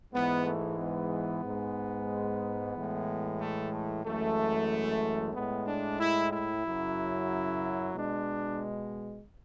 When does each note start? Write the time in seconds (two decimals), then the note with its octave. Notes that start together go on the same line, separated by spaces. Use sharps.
0.14 G#2 E3 G#3 B3
0.46 A3
0.79 B3
1.44 G#2 G#3
2.74 A2 E3 G#3
3.39 A3
3.71 A3
4.05 F#2 E3 G#3 A3
5.34 A2 G#3 B3
5.67 D4
6.00 E4
6.31 E4
6.65 F#2 C#3 F#3
7.95 B2 G#3 D4